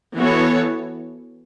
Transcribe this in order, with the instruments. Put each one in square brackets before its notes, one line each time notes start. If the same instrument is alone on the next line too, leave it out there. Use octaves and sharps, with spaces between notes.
[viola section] E3 B3 F#4 A4 C#5